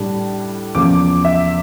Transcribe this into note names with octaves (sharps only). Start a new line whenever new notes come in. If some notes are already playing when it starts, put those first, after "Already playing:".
Already playing: A2 G3 D4
E2 C#3 F3 A#3 D6
E5